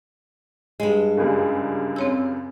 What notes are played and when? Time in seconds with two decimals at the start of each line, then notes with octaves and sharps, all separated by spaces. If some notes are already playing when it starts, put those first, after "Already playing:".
0.80 G2 G#3
1.18 C#2 F#2 G3
1.96 C4 C#5 E6